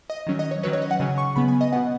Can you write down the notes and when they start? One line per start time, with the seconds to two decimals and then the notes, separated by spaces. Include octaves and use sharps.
0.10 D#5
0.27 D#3 F#3 C#4
0.39 D#5
0.51 C#5
0.63 D#3 F#3 C#4 B4
0.73 C#5
0.82 D#5
0.91 F#5
1.00 C#3 F#3 C#4 G#5
1.18 C#6
1.36 C#3 B3 B5
1.48 G#5
1.61 D#5
1.72 B2 B3 F#5